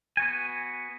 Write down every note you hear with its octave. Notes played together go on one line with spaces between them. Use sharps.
B3 F#4 G#5